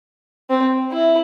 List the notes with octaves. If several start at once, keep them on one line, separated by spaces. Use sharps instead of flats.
C4
E4